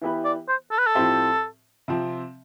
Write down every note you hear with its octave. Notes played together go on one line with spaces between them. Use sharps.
E3 B3 E4 G4 B4
D5
C5
A4
B4
A4
A2 F3 C4 G4 C5
C3 F3 C4